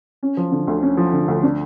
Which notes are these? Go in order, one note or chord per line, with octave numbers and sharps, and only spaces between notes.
C#4
F3
D3
D2
C#4
F3
D3
D2
D4